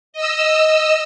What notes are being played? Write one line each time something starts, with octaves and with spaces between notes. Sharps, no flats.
D#5 E6